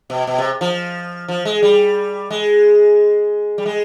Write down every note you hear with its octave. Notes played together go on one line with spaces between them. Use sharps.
B2
B2
C3
F3
F3
G#3
G3
G#3
G3
G#3